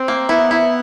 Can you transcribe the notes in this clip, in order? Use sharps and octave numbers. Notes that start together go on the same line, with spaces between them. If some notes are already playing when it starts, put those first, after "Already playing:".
Already playing: C4
A#3
B3 E4
E4